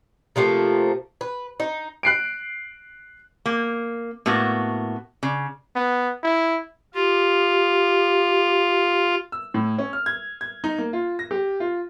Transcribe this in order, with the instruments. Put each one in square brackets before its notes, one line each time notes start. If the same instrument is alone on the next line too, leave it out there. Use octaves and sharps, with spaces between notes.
[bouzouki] C3 F3 A3 A#3
B4
D#4
[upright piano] F#6 C7 D7
[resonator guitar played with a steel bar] A#3
A2 A#3 B3 F#4
C#3
[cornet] B3
E4
[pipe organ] F4 [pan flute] G4
[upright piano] E6
A2
C#4
F6
G#6
G#6
D#4
A#3
F4
A#6
G4
F4